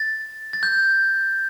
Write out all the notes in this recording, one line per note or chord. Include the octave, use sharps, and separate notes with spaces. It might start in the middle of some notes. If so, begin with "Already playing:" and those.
Already playing: A6
A6
G6